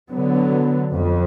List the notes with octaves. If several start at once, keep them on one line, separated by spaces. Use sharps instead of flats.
D3 F#3 B3
F2